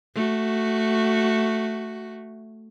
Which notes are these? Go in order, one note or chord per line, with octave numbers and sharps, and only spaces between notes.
A3 F#4